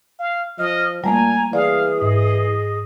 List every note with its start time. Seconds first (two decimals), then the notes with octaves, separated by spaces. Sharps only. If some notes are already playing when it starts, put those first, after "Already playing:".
0.19 F5
0.59 F3 D#5 F6
1.04 A#2 G3 A3 A#3 G#5 A#5
1.53 E3 G#4 D5 F5
2.02 G#2 D#5